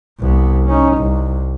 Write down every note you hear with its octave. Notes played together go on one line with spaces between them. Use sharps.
C2 B3
C#4 D#4
C2